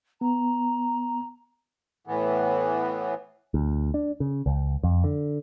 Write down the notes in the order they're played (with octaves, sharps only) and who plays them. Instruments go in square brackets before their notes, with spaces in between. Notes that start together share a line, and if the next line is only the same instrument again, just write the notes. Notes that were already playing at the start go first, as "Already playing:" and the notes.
[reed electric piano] B3 [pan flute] A#5
[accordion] A2 E3 B3
[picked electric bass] D2
D4
C#3
C#2
F2
D3